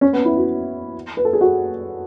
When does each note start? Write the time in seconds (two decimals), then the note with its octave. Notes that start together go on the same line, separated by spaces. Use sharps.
0.01 C#4
0.13 B3
0.25 E4
0.37 F#4
1.17 B4
1.25 A4
1.33 G#4
1.41 F#4